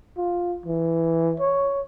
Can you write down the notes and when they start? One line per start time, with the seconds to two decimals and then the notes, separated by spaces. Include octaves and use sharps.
0.17 F4
0.66 E3
1.40 C#5